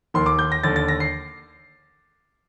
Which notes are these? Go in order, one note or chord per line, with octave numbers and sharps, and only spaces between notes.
D#2 D#3 C6
D6
G6
A#6
D#2 D3 A6
A6
A#6
C7